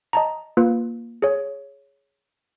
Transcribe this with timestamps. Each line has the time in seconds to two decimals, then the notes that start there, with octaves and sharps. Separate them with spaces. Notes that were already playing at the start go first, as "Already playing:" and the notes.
0.13 D#5 A5 A#5
0.57 A#3 F4 B4
1.22 G#4 C#5